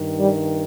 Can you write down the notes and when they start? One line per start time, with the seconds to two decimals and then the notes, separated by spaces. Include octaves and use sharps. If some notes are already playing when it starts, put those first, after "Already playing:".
Already playing: G2 D#3
0.20 G3